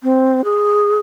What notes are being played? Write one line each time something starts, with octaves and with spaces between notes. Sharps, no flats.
C4
G#4